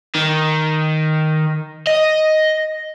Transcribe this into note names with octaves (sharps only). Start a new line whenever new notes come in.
D#3
D#5